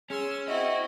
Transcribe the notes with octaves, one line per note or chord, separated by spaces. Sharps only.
C#4 G#4 C6 E6
C4 E4 F#4 D#5